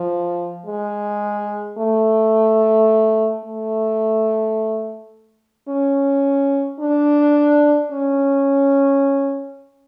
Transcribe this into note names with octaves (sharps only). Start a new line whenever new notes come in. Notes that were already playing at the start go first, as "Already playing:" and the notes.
Already playing: F3
G#3
A3
A3
C#4
D4
C#4